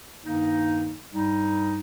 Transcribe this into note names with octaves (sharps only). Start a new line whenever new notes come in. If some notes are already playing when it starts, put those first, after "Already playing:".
G2 D#3 A#3 D#4
G2 G3 D#4